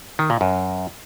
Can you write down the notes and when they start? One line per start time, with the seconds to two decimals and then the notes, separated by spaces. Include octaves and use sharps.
0.19 D#3
0.30 A#2
0.41 F#2